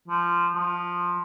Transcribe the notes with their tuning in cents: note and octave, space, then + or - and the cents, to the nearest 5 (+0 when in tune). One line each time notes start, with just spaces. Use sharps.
F3 -15
F3 +10